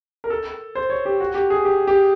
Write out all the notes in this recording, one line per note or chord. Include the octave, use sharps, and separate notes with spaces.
A#4
A4
C5
C#5
G4
F#4
G4
G#4
G4
G4